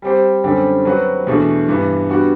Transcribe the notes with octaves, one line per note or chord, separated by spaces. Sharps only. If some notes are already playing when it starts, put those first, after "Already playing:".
G3 C4 G4 C5
F#2 D3 G3 C4 G4
F#3 C4 F#4 B4
E2 B2 A3 D4
G2 E3 B3 D4
G3 B3 D4 F#4